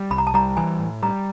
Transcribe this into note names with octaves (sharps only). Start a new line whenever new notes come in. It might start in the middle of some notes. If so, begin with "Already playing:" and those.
Already playing: G3
C2 B5
A#5
A5
G3 A#5
E3 G#5
A2
G3 A#5